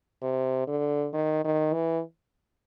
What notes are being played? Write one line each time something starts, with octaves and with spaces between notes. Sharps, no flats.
C3
D3
D#3
D#3
E3